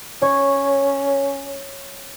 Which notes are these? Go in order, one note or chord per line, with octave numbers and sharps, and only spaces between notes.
C#4 C#5